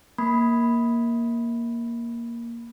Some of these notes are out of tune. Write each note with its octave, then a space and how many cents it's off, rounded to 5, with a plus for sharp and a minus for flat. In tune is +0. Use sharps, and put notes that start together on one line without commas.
A#3 +5 B5 +0